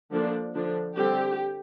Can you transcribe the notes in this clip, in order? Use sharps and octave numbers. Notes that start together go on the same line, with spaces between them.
D3 F3 A#3 D4
D3 F3 D4
D3 G3 C4 G4